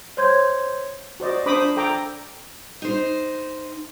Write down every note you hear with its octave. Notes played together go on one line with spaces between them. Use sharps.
C5 C#5 C6 G6 G#6
F#4 C5 D5 D#5
D4 C5 B5 D6 D#6
A4 G5 A#5 D6
D#4 C5